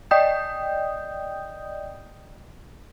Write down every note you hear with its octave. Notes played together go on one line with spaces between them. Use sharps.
D5 D#5 G5 D#6 G6